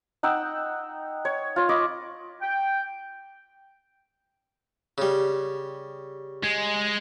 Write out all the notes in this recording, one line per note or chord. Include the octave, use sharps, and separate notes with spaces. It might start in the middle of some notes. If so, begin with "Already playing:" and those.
D#4 F#5 G5 E6
C#5
F4 C#5
D#5 B5 C#6 D6
G5
C#3 G3
G#3